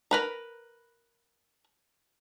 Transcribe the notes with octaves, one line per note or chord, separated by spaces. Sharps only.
A#4 B4 A#5